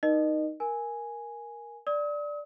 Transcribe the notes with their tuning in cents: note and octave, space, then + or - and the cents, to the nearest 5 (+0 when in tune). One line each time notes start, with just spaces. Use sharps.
D#4 +0 A#4 +25 D#5 -30
A#4 +5 G#5 +0
D5 +0 D#6 +40